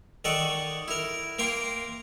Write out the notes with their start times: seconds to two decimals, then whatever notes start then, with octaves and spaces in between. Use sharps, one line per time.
0.25 D#3 D#4 A4 D5 F#5 C#6
0.88 E4 A#4
1.39 A#3 A#4 G5 A#5 C6